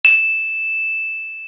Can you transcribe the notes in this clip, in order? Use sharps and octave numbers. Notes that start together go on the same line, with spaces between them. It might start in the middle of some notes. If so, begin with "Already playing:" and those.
E7